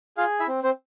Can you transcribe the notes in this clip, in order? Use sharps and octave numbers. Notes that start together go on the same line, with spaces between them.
F4 G#4 F5
E4 E5
C4
C4 C5